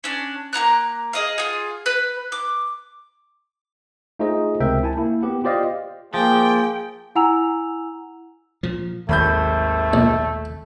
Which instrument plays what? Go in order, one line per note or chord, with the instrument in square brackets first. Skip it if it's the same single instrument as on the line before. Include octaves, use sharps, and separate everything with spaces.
[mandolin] C#4 D4
A#3 E4 A#5 F#6
G#4 D#5 F5
F4 G#4
B4
D6
[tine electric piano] A3 D#4 F4 G#4 C5 D#5
C#2 C3 C4 A#4 E5 G5
E4 G#5 A5
A#3 E4
B3 G4 F#5
F4 G4 C5 D5 D#5 F5
[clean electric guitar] F3 [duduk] A#3 [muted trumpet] G#4 [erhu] G5
[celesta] E4 F#5 G#5 A#5 E6 F7
[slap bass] A#2 F3
[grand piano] G#1 B5 G6 [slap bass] D#2 F#3 [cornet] A3
[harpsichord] A#1